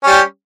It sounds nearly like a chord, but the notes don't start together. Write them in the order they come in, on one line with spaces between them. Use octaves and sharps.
C#4 G3 G4